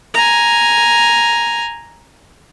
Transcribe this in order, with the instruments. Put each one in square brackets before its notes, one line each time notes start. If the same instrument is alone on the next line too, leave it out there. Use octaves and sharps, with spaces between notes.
[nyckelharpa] G#5 A#5